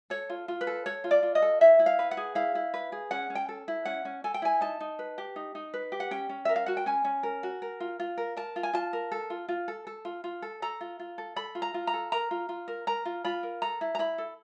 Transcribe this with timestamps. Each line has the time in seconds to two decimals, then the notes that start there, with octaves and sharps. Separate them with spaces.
0.10 A4 C#5
0.30 F4
0.48 F4
0.61 B4
0.67 A4
0.86 A4 C#5
1.04 F4
1.11 D5
1.23 F4
1.35 D#5
1.42 A4
1.61 E4 E5
1.79 E4
1.86 F5
1.99 B4
2.11 F#5
2.17 G#4
2.35 E4 F5
2.55 E4
2.74 B4
2.92 G#4
3.11 C#4 F#5
3.30 C#4
3.35 G5
3.49 A4
3.68 E4
3.85 C#4 F#5
4.05 C#4
4.24 A4 G#5
4.34 G5
4.42 E4 G#5
4.61 D#4 A5
4.80 D#4
4.99 B4
5.18 G4
5.36 D#4
5.55 D#4
5.74 B4
5.92 G4
6.00 F#5
6.11 C#4 G5
6.29 C#4
6.45 A#4 E5
6.56 F5
6.66 F#4 F#5
6.77 G5
6.86 C#4 G#5
7.05 C#4
7.23 A#4
7.43 F#4
7.62 A#4
7.80 F4
8.00 F4
8.18 A#4
8.37 A#4 A5
8.56 F4
8.63 G#5
8.73 F4 A5
8.93 A#4
9.12 A4
9.30 F4
9.49 F4
9.68 A4
9.87 A4
10.05 F4
10.24 F4
10.42 A4
10.62 A4 A#5
10.81 F4
10.99 F4
11.18 A4
11.36 A4 B5
11.55 F4
11.62 A#5
11.74 F4
11.87 A#5
11.94 A4
12.12 A#4 A#5
12.31 F4
12.49 F4
12.68 A#4
12.87 A#4 A#5
13.05 F4
13.25 F4 B5
13.43 A#4
13.62 A4 A#5
13.81 E4
13.95 A#5
13.99 E4 B5
14.18 A4